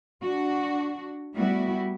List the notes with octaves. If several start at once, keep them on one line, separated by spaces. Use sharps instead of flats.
D4 F#4
G3 A3 B3 E4 F#4